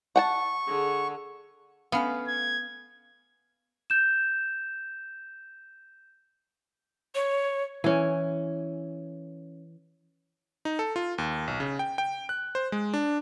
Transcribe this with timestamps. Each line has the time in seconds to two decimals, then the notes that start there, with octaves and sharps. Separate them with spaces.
0.16 F#5 G5 A5 C#6
0.67 D3 G#4
1.92 A3 B3 C#4 F5
2.28 G#6
3.90 G6 E7
7.15 C#5
7.84 E3 C#4
10.65 D#4
10.79 A4
10.96 F4
11.18 D#2
11.48 B1
11.60 C#3
11.79 G5
11.98 G5
12.29 F#6
12.55 C5
12.72 G#3
12.94 D4